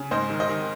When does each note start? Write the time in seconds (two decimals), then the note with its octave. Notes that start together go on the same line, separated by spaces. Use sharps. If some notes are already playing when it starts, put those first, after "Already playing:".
Already playing: C#3
0.11 G#2 C5 D#5
0.30 D#3
0.40 C5 D#5
0.49 D#3